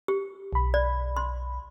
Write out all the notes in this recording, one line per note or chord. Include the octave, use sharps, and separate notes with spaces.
G4
B1 B5
D5
C6